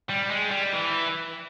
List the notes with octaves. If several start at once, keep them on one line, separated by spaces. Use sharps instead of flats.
G3
G#3
G3
E3